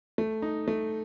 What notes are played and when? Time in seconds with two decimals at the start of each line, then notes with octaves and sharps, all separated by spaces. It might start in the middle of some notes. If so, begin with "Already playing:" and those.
0.18 A3
0.42 D#4
0.68 A3